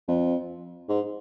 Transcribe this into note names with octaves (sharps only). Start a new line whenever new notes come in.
F2
G#2